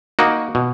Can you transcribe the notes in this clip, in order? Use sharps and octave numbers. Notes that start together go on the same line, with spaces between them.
A#3 D#4 F#4
B2